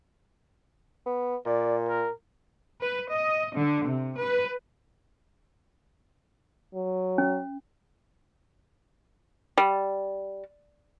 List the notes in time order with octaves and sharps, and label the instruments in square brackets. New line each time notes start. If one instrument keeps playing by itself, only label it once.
[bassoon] B3
[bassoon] A#2 [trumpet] D5
[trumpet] A#4
[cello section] B4
D#5
D3
C3
B4
[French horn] F#3
[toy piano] C#4
[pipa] G3